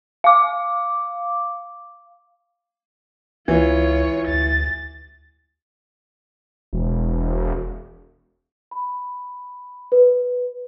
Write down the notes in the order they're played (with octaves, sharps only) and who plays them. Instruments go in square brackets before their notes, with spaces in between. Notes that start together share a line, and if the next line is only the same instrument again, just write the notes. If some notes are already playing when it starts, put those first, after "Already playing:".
[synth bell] F5 D6
[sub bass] C#2 [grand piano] E3 [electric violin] F4 C#5
[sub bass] D2 [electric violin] A6
[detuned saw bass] E1
[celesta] B5
B4